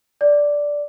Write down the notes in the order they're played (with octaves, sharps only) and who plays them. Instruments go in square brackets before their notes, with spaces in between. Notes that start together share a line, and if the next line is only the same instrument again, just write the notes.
[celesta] D5